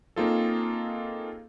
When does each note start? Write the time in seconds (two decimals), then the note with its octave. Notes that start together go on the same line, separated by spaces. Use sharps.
0.16 A#3 C4 D#4 F4 G#4 A4